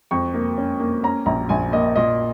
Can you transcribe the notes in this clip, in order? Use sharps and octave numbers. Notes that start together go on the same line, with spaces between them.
F2 C#6
A#3
C#4
A#3
C#4 A#5
A#1 A#5
A#1 G#5
A#3 D#5
A#2 D#5